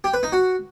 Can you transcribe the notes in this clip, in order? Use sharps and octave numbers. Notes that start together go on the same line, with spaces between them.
G4
B4
D#4
F#4